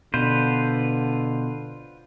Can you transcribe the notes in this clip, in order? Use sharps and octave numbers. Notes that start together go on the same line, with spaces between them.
B2 D3 F4 B4 C5